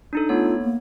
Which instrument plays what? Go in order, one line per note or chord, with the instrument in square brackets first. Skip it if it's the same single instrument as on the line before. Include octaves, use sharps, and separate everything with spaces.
[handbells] D4 D#4 A4
[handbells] A3 B3 C#5 [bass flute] F4
[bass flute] A#3